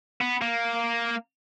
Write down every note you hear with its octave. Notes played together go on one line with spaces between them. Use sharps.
B3
A#3